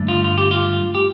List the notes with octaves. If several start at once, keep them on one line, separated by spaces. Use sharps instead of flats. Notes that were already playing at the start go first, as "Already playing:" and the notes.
Already playing: G2 D3 A3
F4
F4
G4
F4
G4